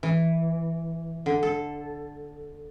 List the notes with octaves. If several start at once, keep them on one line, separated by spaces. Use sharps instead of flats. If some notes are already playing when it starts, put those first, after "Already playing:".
E3
D3
A4